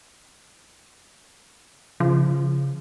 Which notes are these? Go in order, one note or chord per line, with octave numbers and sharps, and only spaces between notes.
C#3 F3